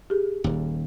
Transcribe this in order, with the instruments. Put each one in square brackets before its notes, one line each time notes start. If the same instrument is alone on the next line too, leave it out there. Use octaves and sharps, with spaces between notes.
[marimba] G4 G#4
[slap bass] D#1 D#2